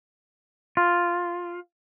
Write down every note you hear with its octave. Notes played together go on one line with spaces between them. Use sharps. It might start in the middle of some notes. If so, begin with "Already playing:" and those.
F4